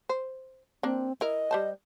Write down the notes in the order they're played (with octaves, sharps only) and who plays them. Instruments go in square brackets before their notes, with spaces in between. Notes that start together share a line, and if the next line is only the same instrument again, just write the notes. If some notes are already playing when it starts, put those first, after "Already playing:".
[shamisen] C5
[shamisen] A#3 D4 [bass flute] C4
[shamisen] E4 A#4 [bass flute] D#5
[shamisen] G3 C5 A5